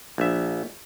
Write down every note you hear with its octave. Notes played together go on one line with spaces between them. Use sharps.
A#1 E5